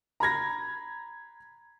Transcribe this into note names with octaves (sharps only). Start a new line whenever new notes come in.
A#5 B5 G#6 A#6